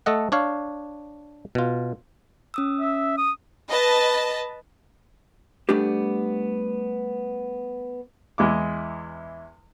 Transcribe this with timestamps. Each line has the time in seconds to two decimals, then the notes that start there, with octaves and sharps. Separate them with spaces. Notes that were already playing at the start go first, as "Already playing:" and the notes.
0.06 A3 A4 D#5 F#5
0.32 D4 C#5 F5
1.55 B2 F4
2.54 C#4 D#6 E6
2.80 E5
3.18 D#6
3.68 B4 D#5 A5
5.69 G3 A3 B3 D4 G4
8.38 E2 G#3 E4 D6